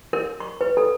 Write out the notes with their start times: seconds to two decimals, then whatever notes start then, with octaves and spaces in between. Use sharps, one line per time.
0.13 A#4
0.40 C#6
0.61 B4
0.77 A4